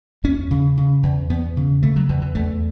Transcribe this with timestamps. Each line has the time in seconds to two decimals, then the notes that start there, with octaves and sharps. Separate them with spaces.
0.24 E2 C#4
0.51 C#3
0.77 C#3
1.03 E2
1.30 E2 B3
1.57 C#3
1.83 C#3 A3
1.96 F#3
2.09 E2 E3
2.22 E3
2.35 E2 A3